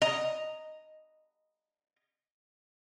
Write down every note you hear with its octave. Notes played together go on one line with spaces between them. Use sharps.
D#5 A#5